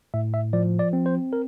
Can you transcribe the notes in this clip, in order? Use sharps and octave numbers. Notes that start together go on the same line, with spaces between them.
A2 E5
E5
F3 D5
D5
C4
C5
A#4